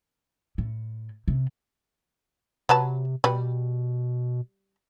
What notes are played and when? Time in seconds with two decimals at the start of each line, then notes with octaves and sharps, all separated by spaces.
0.58 A2
1.28 C3
2.69 C3 F#3 B4 A5
3.24 B2 G3 B4